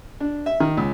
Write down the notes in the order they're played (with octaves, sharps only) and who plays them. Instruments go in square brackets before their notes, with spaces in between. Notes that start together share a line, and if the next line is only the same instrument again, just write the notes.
[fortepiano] D4
E5
D#3
C#2